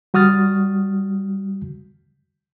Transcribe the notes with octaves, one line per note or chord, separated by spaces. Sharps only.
G3 F#4 D#6 F6 A6